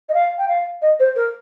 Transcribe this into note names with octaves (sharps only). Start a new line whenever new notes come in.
D#5
F5
G5
F5
D#5
C5
A#4